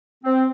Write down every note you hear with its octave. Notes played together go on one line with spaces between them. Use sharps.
C4